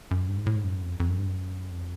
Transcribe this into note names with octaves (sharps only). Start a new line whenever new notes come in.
F#2
G2
G#2
A2
G#2
F#2
F2
F2
F#2
G2
F#2
F2